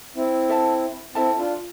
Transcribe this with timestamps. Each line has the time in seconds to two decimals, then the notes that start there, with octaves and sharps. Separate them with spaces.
0.16 C4 E4
0.49 A4 E5 A5
1.15 C4 E4 A4 E5 A5
1.37 D4 F4